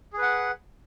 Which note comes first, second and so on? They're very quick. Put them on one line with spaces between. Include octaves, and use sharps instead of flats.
G#4 B4 F#5